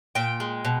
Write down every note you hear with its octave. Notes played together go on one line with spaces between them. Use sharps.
A#2 G5
G#3
B2